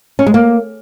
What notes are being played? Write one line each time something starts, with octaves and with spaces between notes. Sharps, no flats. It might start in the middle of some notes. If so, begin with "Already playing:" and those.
C#4
G#3
A#3